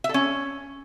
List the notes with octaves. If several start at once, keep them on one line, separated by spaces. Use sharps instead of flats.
E5
A4
C#4